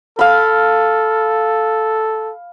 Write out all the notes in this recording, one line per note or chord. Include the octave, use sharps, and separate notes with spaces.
A4 F5 B5